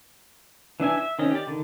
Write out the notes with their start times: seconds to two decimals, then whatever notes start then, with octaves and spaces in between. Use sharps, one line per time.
0.80 E3 D4 E5 G#5
0.98 E5
1.19 D#3 C4 C#4 D#5
1.31 G4 D5
1.47 D3 D#3